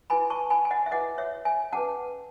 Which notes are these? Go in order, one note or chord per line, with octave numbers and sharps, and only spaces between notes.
E4 G#4 B4 G#5 B5
A5 C#6
G#5 B5
G#5
D#5 F#5
E5
E4 G#4 B4 D#5 F#5
C#5 E5
E5 G#5
C#4 G#4 B4 F#5 A5